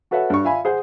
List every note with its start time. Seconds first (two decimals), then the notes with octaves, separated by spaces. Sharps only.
0.11 F#4 A4 B4 C#5 E5 F#5
0.30 G2 C#6
0.44 F4 E5 F5 G#5 B5
0.65 G#4 C5 F#5